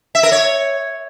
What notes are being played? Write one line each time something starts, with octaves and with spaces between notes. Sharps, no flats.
E5
A#4
C#5